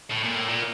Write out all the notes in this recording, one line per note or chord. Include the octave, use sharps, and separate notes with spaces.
A2
A#2
A2
A#2